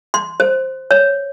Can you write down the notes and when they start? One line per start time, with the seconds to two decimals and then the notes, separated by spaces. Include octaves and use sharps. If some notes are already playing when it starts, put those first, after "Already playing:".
0.14 C6
0.40 C5
0.91 C#5